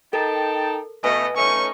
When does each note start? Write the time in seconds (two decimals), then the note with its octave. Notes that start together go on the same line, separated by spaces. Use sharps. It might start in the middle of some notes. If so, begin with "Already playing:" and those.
0.13 D#4 A4 A#4 G5 A5
1.04 B2 A3 B4 D#5 G#5
1.37 A3 C#4 D#4 C#6